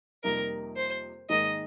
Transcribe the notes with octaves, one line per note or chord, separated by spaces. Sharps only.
F2 C3 G3 A#3 D#4 A#4
C5
G#2 D#3 A#3 D#4 G#4 D#5